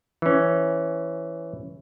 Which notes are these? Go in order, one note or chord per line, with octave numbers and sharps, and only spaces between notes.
E3 C#4